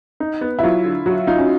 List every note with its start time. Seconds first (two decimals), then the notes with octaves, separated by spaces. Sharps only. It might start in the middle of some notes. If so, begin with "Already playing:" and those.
0.20 D#4
0.41 B3
0.59 E4
0.63 F#3 F4
0.85 D3
1.06 F#3 F#4
1.27 D#4 F4
1.38 C#4